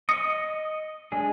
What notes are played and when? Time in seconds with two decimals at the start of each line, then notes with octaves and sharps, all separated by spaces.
0.09 D#5 D#6 A#6 C#7
1.12 G#3 D4 G#4